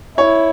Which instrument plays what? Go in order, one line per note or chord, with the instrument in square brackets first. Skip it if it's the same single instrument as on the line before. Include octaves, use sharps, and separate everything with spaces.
[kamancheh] E4 [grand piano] C#5